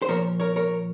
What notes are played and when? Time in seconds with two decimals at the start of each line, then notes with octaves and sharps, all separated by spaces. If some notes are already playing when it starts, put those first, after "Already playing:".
0.02 C5
0.08 A#2 F3 A#4 C#5
0.40 A#4 C#5
0.56 A#4 C#5